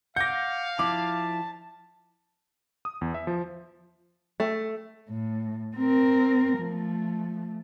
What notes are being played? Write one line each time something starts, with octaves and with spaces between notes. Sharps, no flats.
F5 F#5 D6 G6 A#6
F3 E4 A5 D6
D#6
E2
E5
F3
A3
A2
C4 A#4
F3 A3